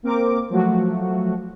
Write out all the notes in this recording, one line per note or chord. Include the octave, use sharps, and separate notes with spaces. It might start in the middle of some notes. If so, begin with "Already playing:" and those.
A#3 C4 A#4 D6
F3 F#3 A3 F#4